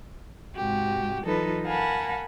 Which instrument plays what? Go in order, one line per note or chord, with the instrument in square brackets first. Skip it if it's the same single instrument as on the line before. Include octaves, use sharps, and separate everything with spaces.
[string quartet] G#2 C3 G#3 F#4 G4
E3 F#3 D#4 F4 A4 B4
A#4 F5 F#5 G#5 A5 B5